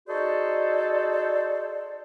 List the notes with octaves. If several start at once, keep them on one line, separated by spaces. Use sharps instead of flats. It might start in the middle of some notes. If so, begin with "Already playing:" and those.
D#4 F#4 G#4 A4 C5 D5